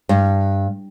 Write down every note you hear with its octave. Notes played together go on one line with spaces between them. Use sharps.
G2